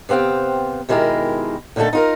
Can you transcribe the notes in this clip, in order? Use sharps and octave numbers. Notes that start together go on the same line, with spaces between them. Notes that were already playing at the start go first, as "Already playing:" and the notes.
C3 B3 C4 F5 G5
B2 D#3 G#3 E4 G4 A#4
A#2 D3 D#3 G#3 A3 A4
D#4 F4 A#4